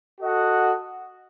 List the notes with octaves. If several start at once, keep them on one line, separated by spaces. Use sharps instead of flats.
F#4 A4 D#5 F#5